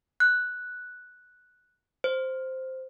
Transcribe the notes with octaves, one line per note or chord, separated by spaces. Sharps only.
F#6
C5